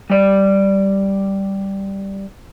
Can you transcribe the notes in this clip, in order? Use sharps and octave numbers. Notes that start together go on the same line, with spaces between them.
G3 D5